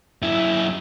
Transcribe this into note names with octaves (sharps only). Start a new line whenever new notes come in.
F#2 E4